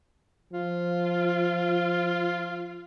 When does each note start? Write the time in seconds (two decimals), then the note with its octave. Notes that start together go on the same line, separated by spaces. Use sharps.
0.53 F3 F4